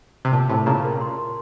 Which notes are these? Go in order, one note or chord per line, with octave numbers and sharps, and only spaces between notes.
C3
A#2 A5
A2 C3 A5
A#2 C#3 A#5
A#4
C6
C6